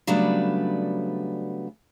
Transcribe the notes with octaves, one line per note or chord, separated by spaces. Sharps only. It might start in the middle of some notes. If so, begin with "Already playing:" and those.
C#3 F#3 G3 A3 B3 D4